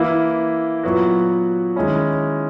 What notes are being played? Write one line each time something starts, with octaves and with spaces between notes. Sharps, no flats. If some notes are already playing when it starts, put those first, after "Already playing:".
Already playing: E3 A#3 E4
A#2 F#3 B3 F#4
D#3 G#3 C#4 E4